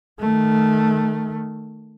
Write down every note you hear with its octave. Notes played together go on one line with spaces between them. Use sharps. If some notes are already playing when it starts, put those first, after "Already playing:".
D#3 A3